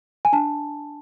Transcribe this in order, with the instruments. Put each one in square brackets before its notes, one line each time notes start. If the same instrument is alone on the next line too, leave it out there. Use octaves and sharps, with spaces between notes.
[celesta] G#5
D4 A5